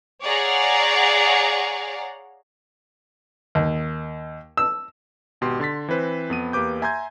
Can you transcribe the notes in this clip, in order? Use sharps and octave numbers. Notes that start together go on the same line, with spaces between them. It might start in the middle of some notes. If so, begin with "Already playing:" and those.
G#4 C#5 D5 F5 F#5 A#5
D#2
E6
G#1 B2 G4 C6
D3 C6 A6 B6
E3 C4 B4 C5
F2 B3 D#7
E2 A#3 G4 B4 D6 G6
E5 G#5 A#5 C6 G6 G#6